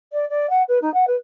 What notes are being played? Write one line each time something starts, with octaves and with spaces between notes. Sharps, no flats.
D5
D5
F#5
B4
D#4
F#5
B4